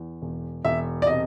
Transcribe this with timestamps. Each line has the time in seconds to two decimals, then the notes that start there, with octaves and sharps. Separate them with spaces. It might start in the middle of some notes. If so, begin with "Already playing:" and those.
Already playing: E2
0.22 E1
0.64 E1 E5
1.02 D5
1.06 C3 D#5